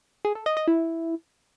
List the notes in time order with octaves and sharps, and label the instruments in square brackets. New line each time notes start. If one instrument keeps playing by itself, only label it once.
[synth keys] G#4
A4
D#5
D#5
E4